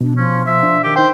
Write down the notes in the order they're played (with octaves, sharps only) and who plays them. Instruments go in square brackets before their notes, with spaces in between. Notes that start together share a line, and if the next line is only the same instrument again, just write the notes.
[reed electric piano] B2 [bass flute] D4
[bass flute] F3 [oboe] C#4
[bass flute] F3 [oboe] E5
[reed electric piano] D4
[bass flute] D#3 [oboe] G4
[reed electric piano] D#4 G5 [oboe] C5